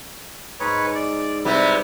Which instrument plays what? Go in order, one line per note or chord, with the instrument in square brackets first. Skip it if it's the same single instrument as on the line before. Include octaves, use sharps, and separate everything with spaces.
[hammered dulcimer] G#2 A#5 [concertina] B4 C#5
[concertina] D5
[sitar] C3 G3 [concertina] E4 B4